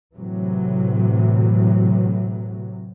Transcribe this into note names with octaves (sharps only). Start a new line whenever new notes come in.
A2 C3 E3 F#3